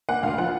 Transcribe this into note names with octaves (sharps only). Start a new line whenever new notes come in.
A#3 F#5
D2 F5
F3 F#5